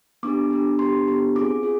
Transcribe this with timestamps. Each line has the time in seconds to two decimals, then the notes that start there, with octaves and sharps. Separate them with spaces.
0.23 B3 D4 G4 D6
0.51 B3 D4 G4
0.79 B3 D4 G4 C6
1.08 B3 D4 G4
1.35 C4 F4 G#4 D6
1.63 F4 G#4